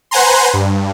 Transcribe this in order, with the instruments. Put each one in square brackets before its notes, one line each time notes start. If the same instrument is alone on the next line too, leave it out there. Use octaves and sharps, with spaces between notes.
[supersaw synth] B4 C5 F#5 G#5 A#5 C6
G2